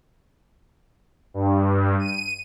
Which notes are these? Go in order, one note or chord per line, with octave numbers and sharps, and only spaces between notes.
G2
D#7